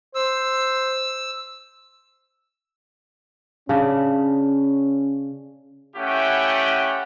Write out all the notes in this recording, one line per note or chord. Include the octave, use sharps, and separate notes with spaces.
C5 E6
C#3 C#4 D4
A3 C#4 E4 G4 F#5 G5